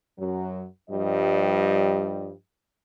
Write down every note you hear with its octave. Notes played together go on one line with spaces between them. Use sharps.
F#2 F#3
G2 F3 G3 D#5